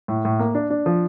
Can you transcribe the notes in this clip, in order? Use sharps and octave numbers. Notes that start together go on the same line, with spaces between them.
A2
A2
A#3
D4
D4
F3